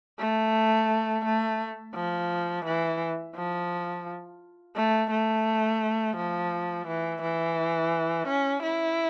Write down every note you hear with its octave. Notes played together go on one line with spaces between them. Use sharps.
A3
A3
F3
E3
F3
A3
A3
F3
E3
E3
C#4
E4